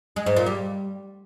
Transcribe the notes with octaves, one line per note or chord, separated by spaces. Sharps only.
G#3
G#2
A#2
G3